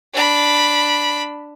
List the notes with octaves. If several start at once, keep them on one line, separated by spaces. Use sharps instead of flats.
D4 B5